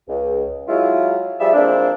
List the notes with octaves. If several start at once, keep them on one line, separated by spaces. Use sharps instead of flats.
C#2
F#3 G#3 E4 F4
F3 G3 F4 G#4 E5
E3 F3 G#3 A#3 C4 D4